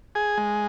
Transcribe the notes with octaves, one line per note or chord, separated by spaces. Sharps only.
G#4
G#3